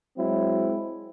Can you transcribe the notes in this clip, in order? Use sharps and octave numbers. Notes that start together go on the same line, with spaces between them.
F#3 G#3 C4 E4